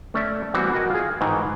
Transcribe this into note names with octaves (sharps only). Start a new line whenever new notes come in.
A3 C#4 C#5 D5 E5
E3 G3 B3 C4 F#4
F#4 A#4 D#5 G5 G#5
F4 G#4
G#2 D#3 E3